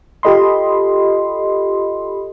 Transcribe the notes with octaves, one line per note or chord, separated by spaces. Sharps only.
F4 G4 A4 D#5 B5 C6